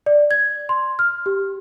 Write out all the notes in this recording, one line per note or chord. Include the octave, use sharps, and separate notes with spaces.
D5
G#6
C6
F6
G4